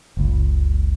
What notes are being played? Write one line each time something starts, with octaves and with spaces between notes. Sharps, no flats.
F#1 C#2